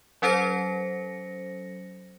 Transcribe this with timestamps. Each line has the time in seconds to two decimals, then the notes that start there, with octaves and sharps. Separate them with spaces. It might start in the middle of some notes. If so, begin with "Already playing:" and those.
0.22 F#3 C#4 A4 C5 A#6 C#7